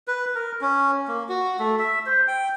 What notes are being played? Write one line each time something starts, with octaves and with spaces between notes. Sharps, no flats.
B4
A#4
C#4
A#3
F#4
A3
E5
C5
G5